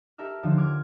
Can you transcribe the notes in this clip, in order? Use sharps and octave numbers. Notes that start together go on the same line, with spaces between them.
G4 A4 A#4 E5 F6
D#2 D3 F3
D6 F6 G#6